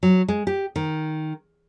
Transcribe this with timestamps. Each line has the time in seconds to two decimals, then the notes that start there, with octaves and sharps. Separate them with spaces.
0.03 F#3
0.28 G#3
0.47 G4
0.76 D#3